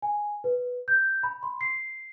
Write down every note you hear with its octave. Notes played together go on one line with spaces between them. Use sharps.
G#5
B4
G6
B5
C6
C7